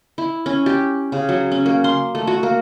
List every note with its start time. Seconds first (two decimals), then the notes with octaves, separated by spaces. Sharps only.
0.18 E4
0.46 C#4
0.66 G4
1.12 C#3
1.29 F#3
1.52 C#4
1.66 A#3
1.84 C6
2.15 A3
2.27 F#4
2.43 A#3